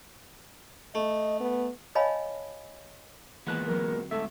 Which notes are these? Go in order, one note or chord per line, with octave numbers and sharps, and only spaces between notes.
A3 D#5
B3
C#5 D#5 F5 G#5 A5 B5
A#2 D#3 E3 G#3 B3 A5 F#6
D2 F#3 C4 A#4
G#2 A3 A4 E5